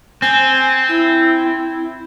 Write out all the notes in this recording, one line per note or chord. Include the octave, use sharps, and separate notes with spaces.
C4 G#5
E4